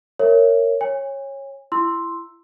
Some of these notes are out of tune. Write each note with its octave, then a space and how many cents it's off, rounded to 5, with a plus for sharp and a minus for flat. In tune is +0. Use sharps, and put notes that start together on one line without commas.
A#4 -15 C#5 +0 E5 +0
C#5 -15 G#5 -35
E4 +25 C6 +0 E6 +0